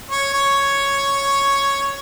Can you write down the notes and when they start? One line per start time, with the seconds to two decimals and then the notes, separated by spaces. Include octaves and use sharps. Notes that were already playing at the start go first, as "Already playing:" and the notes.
0.11 C#5
0.33 C#5